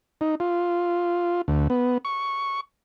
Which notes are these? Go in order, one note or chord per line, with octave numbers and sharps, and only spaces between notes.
D#4
F4
D2
B3
C#6